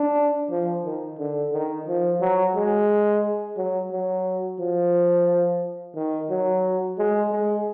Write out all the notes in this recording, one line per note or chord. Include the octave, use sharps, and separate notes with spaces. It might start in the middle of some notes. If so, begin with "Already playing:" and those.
Already playing: D4
F3
D#3
D3
D#3
F3
F#3
G#3
F#3
F#3
F3
D#3
F#3
G#3
G#3